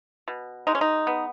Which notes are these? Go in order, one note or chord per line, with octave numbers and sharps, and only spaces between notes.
B2
G#3 D#4
C#4
D#4
B3